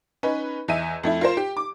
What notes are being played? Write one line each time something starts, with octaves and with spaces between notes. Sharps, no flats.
C#4 D#4 B4
E2 D#5 E5 D#7
F2 A3 E4
F4 A#4 C5
G4
D6